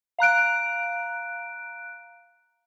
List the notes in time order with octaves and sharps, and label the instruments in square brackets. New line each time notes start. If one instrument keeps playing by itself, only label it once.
[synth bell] F5 A#5 F#6 D7